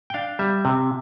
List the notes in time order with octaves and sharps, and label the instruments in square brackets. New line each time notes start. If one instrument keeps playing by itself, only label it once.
[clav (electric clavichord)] G5
D4 F5
G3 E5
C3